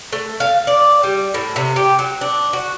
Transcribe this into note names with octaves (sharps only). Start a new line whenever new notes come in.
A3
F5
D5
G3
A2
C3
G4
F#3
D4
F#4